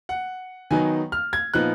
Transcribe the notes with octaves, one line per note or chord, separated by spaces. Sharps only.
F#5
D#3 F#3 B3 D#4 G#5
F6
G#6
A#2 F3 B3 D#4 F#6